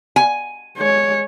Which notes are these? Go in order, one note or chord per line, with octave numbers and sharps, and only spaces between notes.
G#5
G#3 C#5